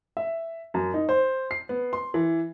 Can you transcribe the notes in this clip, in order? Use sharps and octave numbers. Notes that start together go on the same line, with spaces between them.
E5
F#2
D#4
C5
C7
B3
C6
E3